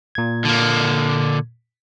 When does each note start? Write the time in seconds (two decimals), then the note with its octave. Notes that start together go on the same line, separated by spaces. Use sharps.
0.15 A#2 G#6
0.45 D3 A#3